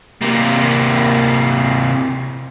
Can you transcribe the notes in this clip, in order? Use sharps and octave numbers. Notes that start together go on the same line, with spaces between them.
C3 A#3